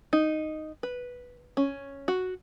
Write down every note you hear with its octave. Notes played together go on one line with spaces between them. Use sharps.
D#4
B4
C#4
F#4